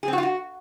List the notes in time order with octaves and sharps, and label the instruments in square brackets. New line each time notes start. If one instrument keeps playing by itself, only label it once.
[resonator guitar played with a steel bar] G#4
C4
F#4
F4
F#4